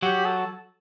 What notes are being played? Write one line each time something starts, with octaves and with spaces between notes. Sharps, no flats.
F#3 F#4 G4
A4